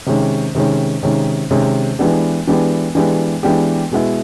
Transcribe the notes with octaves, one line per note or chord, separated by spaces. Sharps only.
C3 D#3 G#3 C#4
C3 D#3 G#3 C#4
C3 D#3 G#3 C#4
C3 D#3 G#3 C#4
E3 G#3 B3 D4 G4
E3 G#3 B3 D4 G4
E3 G#3 B3 D4 G4
E3 G#3 B3 D4 G4
B2 G#3 B3 E4